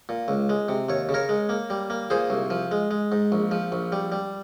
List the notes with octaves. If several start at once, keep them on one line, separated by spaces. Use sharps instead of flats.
A#2
C#2
G#3
C3
D#2 C#5
C#3
A#4 C#5
G#3
A#3
G3
A#3
A#2 G#4 C5
C2
F3
G#3
G#3
G#2
A#1
F3
A#1
G3
G3